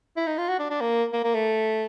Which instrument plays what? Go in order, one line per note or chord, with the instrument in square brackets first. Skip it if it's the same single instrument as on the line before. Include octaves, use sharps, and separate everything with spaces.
[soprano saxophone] E4
D#4
F4
F#4
D4
D4
A#3
A#3
A#3
A3